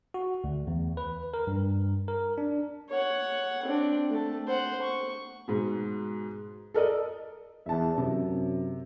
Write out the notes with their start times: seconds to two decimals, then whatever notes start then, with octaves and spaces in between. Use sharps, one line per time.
0.14 F#4
0.44 D2
0.67 E2
0.97 B4
1.34 A#4
1.47 G2
2.08 A#4
2.38 D4
2.89 C#5 F#5
3.65 C4 D4
4.10 A3 A5
4.47 C5 F#5
4.82 C#6
5.48 G#2 B2
6.74 A4 A#4 D5 D#5
7.66 E2 E5 A5
7.98 F#2 C3